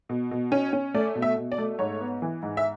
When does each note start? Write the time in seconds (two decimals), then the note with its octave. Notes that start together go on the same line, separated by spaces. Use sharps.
0.09 B2
0.31 B2
0.52 C#4
0.73 C#4
0.94 A3 D5
1.15 B2
1.22 E5
1.37 B2
1.52 D5
1.58 A3
1.79 G#2 C#5
2.01 B3
2.22 E3
2.43 G#2
2.57 E5